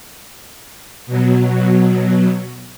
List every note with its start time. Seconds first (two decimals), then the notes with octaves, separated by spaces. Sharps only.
1.07 B2 F#3